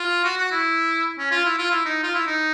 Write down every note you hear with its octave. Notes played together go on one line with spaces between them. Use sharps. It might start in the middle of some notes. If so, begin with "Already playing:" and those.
Already playing: F4
F#4
F#4
E4
C#4
F4
E4
F4
E4
D#4
F4
E4
D#4